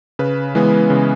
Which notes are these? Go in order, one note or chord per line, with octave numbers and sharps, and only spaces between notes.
C#3 B4
E3 G#3 B3
C#3